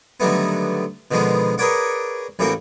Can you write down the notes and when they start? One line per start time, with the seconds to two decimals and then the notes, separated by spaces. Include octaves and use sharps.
0.20 D3 D#3 F#3 G3 A3 B3
1.11 B2 D3 D#3 F3 G#3 B3
1.58 G#4 A#4 B4 C#5 D5 F#5
2.39 A1 A2 E3 A#3 F#4 G5